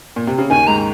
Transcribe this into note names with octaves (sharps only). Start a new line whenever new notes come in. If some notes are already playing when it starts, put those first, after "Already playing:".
A#2
C3
C#3
D#2 D#3 G#5
G#2 A#5